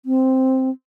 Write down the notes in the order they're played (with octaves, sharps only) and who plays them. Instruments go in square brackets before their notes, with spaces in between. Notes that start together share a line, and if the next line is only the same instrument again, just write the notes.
[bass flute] C4